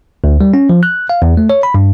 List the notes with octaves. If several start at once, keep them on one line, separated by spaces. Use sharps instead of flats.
D2
G3
C#4
F3
F#6
F5
E2
A3
C#5
B5
G2